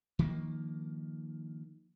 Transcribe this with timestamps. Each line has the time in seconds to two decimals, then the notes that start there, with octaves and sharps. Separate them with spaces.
0.19 D#3 F3 A#3